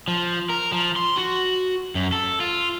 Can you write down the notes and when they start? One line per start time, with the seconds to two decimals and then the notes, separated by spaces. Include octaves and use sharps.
0.08 F3
0.50 A#4
0.72 F3
0.96 C6
1.17 F#4
1.95 F#2
2.12 A4
2.40 F4